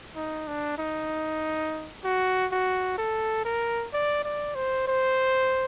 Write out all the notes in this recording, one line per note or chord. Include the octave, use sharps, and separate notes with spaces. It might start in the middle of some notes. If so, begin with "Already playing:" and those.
D#4
D4
D#4
F#4
F#4
A4
A#4
D5
D5
C5
C5